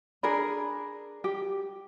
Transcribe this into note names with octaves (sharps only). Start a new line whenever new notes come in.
D4 G#4 A#4 B5
G4